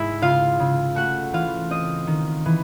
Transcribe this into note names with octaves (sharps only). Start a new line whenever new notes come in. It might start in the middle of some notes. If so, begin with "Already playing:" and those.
Already playing: G#2 G#3 E4 E5
C#3 F4 F5
C#3
A3 F#4 F#5
E3 F4 F5
C4 D#5
D#3
E3